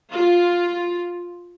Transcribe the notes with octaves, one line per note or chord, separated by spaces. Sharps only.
F4